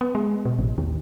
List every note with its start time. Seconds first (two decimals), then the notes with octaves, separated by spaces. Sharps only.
0.01 B3
0.15 G#3
0.45 B2
0.59 A1
0.78 D#2